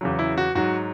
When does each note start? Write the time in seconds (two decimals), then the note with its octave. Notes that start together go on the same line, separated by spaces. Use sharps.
0.01 E2 C#3 F#3
0.19 E4
0.38 F#4
0.55 G#2 F#3 F#4